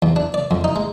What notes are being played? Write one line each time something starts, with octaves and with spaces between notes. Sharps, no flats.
E2
D4
D5
F2
D#4
G#3